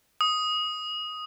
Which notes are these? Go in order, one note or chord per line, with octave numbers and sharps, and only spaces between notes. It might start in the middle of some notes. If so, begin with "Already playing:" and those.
D#6